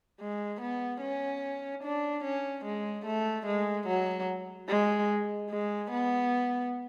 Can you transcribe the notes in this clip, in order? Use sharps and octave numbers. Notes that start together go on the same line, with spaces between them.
G#3
B3
C#4
D4
C#4
G#3
A3
G#3
F#3
G#3
G#3
B3